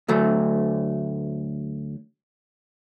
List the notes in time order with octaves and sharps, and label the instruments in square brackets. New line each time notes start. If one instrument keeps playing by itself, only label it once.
[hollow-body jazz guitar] D2 F#3 A3